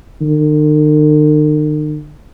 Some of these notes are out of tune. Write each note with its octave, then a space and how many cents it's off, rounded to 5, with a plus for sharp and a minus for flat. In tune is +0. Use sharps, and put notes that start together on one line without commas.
D#3 -45